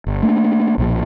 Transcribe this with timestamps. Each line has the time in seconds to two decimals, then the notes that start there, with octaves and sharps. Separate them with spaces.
0.07 G1
0.22 A3 A#3 D4
0.78 B1 A#2 F3